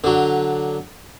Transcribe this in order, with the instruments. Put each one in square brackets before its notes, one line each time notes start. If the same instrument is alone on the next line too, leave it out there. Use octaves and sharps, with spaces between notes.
[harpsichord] D3 F#3